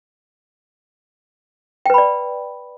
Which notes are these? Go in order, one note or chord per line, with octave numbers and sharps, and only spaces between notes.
B4 D5 G5 B5